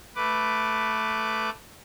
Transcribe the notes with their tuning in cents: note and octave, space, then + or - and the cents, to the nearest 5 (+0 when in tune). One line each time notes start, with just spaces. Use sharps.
A3 +0 B4 +0 D6 +0